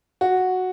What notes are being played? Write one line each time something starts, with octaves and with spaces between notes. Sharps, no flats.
F#4